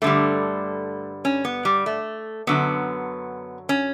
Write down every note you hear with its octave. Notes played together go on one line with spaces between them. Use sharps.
G2 D3 G3 A3
C#4
B3
G3
A3
F#2 D3 F#3 B3
C#4